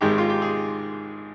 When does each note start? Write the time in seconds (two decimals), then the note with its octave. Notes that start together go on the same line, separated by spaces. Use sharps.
0.01 G#1 G#2 D#3 G#3 G4
0.18 F4
0.30 G4
0.42 G#4